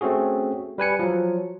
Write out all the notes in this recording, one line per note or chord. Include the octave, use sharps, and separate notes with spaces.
A3 C4 C#4 F#4 G#4
G3 B4 G#5 C#7
F3 F#3